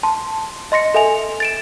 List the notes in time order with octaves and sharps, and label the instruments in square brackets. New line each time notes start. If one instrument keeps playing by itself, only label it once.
[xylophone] A5 C6
D#5 C6 A#6 C#7
A4 E5 G#5 F7
A6 D7 E7